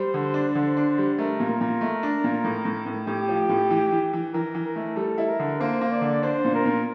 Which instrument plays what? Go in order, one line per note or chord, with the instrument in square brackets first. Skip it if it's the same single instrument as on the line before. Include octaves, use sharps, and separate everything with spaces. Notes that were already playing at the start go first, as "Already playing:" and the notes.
Already playing: [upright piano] G3 [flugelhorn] C5
[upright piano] D3
D4
[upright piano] D3 [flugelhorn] C5
[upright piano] D4
G3
[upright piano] A3 [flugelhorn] A#4
[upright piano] A#2
[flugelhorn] A#4
[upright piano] A#2
A3
D4
A#2
A2
A2
A2
[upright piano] A2 [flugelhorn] G4
[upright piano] F3
A2
E3
E3
E3
[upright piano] E3 [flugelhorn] A#4
[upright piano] E3
[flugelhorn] A#4
[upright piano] A3
[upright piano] G3 [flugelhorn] A4
[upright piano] E4
[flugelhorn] A#4
[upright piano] D3
[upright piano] A#3 [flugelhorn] C5
[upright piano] A#3
[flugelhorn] D5
[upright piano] D3
[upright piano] D4 [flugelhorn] C5
[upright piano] A#2
[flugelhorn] A#4
[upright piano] A#2